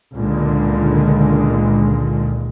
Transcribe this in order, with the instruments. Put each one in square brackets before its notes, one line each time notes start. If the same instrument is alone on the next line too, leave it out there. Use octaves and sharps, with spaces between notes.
[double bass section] C#2 A#2 D3 D#3 G#3